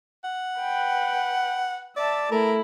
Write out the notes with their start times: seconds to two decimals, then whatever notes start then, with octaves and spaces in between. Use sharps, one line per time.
0.24 F#5
0.60 B4 G5
1.97 D5 E5 A5
2.32 A3 E4 A#4